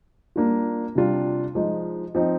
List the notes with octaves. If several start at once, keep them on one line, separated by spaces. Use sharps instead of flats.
G3 A#3 D4 F4
C3 G3 D4 F4
F3 G#3 D#4
F3 C4 D#4